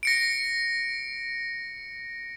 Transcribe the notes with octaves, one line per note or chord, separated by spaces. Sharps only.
A#6 C#7 D7